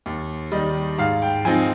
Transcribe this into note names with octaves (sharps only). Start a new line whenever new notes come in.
D#2
D#3 G3 D#5
G#2 F5
G5
F3 C4 D#4 G#5